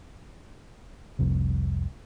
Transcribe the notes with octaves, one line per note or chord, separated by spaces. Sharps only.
F1 C2 F2